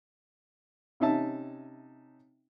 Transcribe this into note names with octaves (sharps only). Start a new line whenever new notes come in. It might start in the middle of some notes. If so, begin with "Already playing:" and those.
C3 C#4 D#4 E5 A5